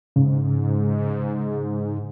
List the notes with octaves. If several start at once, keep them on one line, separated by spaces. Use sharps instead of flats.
G#2 C#3